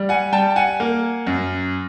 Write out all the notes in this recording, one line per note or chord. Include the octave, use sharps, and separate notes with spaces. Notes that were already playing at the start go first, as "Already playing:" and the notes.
Already playing: G3
F#5 G#5
G3 G5 A5
F#5 G#5
A#3
F#2